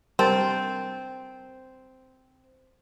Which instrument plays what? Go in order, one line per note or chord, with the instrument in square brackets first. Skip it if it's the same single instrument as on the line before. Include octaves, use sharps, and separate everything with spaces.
[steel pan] G3 A#4 A5 [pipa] C4